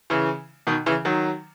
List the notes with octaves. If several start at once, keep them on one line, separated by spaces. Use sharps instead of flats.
C#3 E3
B2 D#3
C#3 E3
D#3 F#3